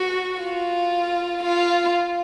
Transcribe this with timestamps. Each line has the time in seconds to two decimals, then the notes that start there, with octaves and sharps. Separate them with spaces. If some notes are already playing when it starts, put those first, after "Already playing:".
Already playing: F#4
0.41 F4
1.43 F4